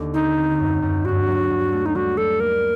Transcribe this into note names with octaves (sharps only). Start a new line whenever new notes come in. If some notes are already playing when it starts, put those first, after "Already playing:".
Already playing: D#2 D3
C4 D#4
C4
F#2
F#2
G2 F#4
F#3
G2
A3
D#4
G3 F#4
G3 A4
A#3 A#4